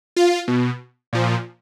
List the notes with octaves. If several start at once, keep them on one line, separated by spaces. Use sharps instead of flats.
F4
B2
A#2 F3